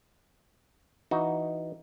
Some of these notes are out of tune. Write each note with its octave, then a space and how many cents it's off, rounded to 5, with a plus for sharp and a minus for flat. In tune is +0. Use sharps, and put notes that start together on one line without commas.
E3 +0 D#4 +0 F#4 +0